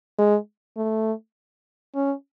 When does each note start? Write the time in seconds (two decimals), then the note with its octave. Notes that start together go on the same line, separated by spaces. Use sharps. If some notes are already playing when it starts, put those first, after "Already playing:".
0.18 G#3
0.77 A3
1.95 C#4